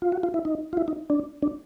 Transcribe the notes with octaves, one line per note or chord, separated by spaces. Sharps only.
F4
F#4
F4
E4
D#4
F4
E4
D#4
D4
D4